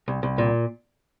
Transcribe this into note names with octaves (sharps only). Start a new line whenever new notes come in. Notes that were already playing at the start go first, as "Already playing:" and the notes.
C2
C2
A#2